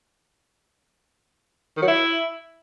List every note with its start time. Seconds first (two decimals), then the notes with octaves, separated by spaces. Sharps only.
1.77 D#3
1.82 F#3
1.88 E4